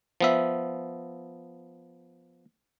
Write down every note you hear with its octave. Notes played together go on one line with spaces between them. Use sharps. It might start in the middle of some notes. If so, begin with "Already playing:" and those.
F3 B3 E5